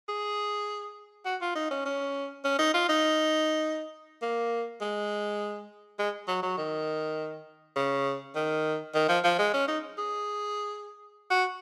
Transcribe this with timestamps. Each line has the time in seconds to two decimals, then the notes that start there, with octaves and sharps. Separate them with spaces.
0.09 G#4
1.26 F#4
1.41 F4
1.55 D#4
1.71 C#4
1.85 C#4
2.44 C#4
2.59 D#4
2.74 F4
2.89 D#4
4.22 A#3
4.81 G#3
5.99 G#3
6.28 F#3
6.43 F#3
6.58 D#3
7.76 C#3
8.35 D#3
8.95 D#3
9.09 F3
9.24 F3
9.39 G#3
9.54 C#4
9.68 D#4
9.98 G#4
11.30 F#4